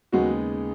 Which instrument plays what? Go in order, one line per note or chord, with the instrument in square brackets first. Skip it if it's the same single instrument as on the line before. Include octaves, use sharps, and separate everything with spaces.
[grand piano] D#2 C#3 G#3 B3 D#4 [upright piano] F#3 F#4